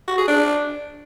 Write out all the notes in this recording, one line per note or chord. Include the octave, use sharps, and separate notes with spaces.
F#4
G#4
D4